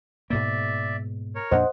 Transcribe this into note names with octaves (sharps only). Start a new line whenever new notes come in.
G#2 B2 A#3 D5 E5
A#4 C#5
F2 A#2 D4 C5 D#5 F#5